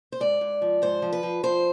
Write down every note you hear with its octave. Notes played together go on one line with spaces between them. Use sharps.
C5
G#2 D5
G#2
F3
G#2 C5
F3
B4
F3
F3 C5